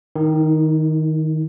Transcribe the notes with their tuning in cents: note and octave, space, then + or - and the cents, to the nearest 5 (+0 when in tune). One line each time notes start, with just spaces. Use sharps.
D#3 +5 E4 -45